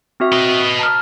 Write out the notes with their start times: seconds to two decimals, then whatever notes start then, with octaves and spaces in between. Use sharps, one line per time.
0.20 C4 F#4 E5
0.32 B4 D#5
0.79 A5 A#5 F6